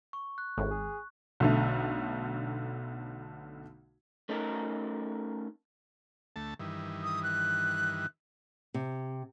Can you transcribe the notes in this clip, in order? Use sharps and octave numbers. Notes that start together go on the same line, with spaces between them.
C#6
F#6
G#1 A2
G#4
B1 D3 A3
A3 C#4 D#4 A4 A#4
D2 A3 A5
G2 D#3 E3
D#6
F#6
C3